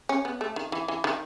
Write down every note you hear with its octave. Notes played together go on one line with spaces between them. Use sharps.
C#4
B3
A3
D#3
E3
E3
D#3